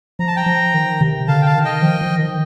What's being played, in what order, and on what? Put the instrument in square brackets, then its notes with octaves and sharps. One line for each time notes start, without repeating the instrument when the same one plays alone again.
[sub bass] F3 [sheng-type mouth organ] A#5
[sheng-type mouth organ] A5
G5 A#5
[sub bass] F3
D#3
C3
[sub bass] D3 [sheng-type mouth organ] F5 A5
[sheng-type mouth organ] G5
F5 A5
[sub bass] D#3
[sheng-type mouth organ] D#5 G5
[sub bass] F3
F3
D#3